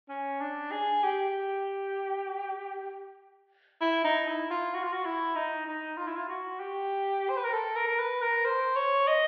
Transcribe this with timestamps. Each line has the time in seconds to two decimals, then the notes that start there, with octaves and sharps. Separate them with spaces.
0.09 C#4
0.41 D4
0.72 G#4
1.03 G4
3.81 E4
4.05 D#4
4.27 E4
4.51 F4
4.74 F#4
4.83 F4
4.92 F#4
5.05 E4
5.36 D#4
5.67 D#4
5.97 F4
6.07 E4
6.16 F4
6.29 F#4
6.60 G4
7.29 C5
7.37 B4
7.45 A#4
7.53 A4
7.76 A#4
7.88 A#4
7.99 B4
8.22 A#4
8.45 C5
8.76 C#5
9.07 D#5